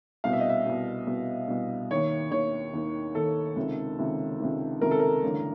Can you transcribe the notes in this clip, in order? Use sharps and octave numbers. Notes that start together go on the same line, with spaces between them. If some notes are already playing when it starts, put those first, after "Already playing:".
C2 B2 F5
E5
D#5
E5
C2 B2
C2 B2
C2 B2
D#2 D#3 C#5
D#2 D#3 C#5
D#2 D#3
D#2 D#3 A4
C#2 C3 D#3
C#2 C3 D#3
C#2 C3 D#3
C#2 C3 D#3 A#4
A4
A#4
A1 G2 D3